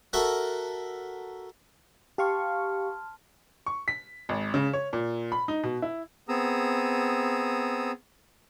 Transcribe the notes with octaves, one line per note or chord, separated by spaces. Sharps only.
F#4 A4 A#4 E5 F#5
G4 F5 A5 C6 C#6 F6
C#6
B6
G#1
C#3
C#5
A#2
B5
D#4
B2
E4
B3 C4 G#4 A#5 D#6 E6